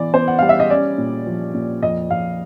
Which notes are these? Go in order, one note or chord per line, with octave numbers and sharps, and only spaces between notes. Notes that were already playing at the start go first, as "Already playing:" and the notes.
Already playing: E3 B3 D5
B3 C5
F#5
G3 F5
E5
D#5
C#4 D5
A#2
F3
A#2
F2 D#5
F2 F5